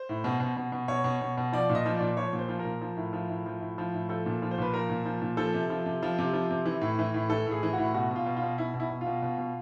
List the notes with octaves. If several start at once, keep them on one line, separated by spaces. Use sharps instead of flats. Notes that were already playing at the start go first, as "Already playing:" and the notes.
Already playing: C5
A2
B2
B2
B2
B2
B2 C#5
B2
B2
B2
F3 D5
A#2
D#5
F3
D5
A#2
F3 C#5
A#2
C5
F3
A#4
A#2
F3
A2
F3
A2
F3
A2
F3
A2
F3 A4
A#2
F3
C5
A#2 B4
F3 A#4
A#2
F3
A#2
F3 A4
C3
F3
C3
F3
C3
F3
C3
E3
A2
E3
A2
E3 A4
A2 G#4
E3
A2 F#4
B2 F#4
B2 F4
B2
F4
B2
B2 E4
B2
E4
B2
F4
B2
B2
B2